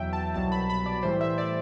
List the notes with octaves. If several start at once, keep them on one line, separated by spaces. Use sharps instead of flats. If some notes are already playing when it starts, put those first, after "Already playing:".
Already playing: E2 B2 F#3 E5 G5
A5
C2 B2 F#3 A5
B5
B5
D5
A2 E3 G3 C5
E5
D5